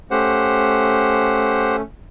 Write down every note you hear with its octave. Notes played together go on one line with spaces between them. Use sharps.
A3 C#4 G4 C5 F#5